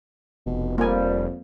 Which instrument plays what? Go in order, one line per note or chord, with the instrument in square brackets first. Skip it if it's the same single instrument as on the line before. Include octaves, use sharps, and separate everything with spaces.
[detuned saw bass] F1 [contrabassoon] B2
[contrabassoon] F2 [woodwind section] F3 G3 [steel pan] A#3 G#5